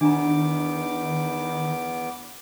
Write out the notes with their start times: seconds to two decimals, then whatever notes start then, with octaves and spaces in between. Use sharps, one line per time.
0.01 E2 D#3 B3 D4 G#5 A#5 D6